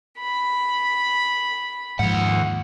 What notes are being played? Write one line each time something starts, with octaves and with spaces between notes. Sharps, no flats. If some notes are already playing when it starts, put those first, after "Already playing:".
B5
D#2 G#2 F3 F#5